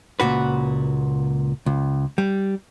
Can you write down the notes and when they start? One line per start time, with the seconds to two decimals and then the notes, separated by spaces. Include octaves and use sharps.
0.20 C#2 A#2 F#4 B4
1.66 C#2
2.18 G3